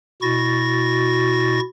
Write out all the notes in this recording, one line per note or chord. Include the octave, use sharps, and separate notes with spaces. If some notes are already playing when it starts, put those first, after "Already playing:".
B2 E4 F#4 C#6 A6 A#6